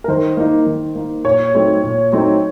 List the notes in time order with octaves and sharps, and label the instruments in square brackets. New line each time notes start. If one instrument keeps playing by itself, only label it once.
[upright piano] A#4
[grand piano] D#3 [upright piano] C5
[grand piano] A#3 D#4
D#3
A#3 D#4
[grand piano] A#2 [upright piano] C#5
[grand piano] F#3 A3 C4 D#4
A#2
F#3 A3 C4 D#4